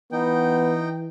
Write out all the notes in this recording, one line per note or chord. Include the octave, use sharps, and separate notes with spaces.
E3 B3 D#4 G5